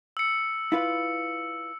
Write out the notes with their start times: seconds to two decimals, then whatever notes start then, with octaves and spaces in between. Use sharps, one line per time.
0.17 E6 C#7
0.72 E4 F4 B4